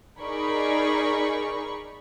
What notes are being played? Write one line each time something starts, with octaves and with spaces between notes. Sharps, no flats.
D#4 G#4 A#4 D5 B5 C#6